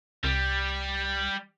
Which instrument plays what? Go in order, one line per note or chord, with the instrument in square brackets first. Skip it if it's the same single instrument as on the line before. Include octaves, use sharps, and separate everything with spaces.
[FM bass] C2 [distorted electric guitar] G3